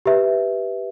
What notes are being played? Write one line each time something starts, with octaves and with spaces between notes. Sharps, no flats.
G4 B4 E5